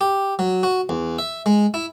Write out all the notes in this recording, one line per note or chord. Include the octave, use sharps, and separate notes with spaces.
G4
F#3
F#4
E2
E5
G#3
E4